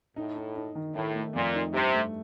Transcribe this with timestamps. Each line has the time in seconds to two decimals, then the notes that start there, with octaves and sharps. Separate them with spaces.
0.16 A2 D#4
0.36 D#4
0.56 D#4
0.75 D#3
0.95 A2 D#3
1.15 A3
1.35 F2 A#2
1.54 D#4
1.74 G2 C3
1.94 A3